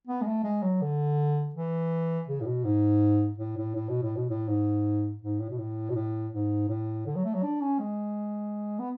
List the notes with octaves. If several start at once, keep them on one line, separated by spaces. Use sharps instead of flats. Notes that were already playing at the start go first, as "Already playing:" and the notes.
B3
G#3
A3
G#3
F#3
D3
E3
C#3
A2
B2
G#2
A2
A2
A2
B2
A2
B2
A2
G#2
G#2
A2
B2
A2
B2
A2
G#2
A2
D3
F#3
A3
F#3
D4
C#4
G#3
B3